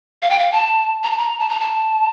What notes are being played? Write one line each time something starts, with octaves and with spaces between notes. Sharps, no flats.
F5
G5
F5
A5
A#5
A5
A#5
A5
A#5
A5